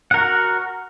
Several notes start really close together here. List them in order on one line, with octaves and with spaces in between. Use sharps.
F#5 A#4 F#4